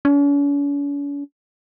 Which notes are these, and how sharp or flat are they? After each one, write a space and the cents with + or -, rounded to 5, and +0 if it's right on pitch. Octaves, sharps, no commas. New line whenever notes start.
C#4 +45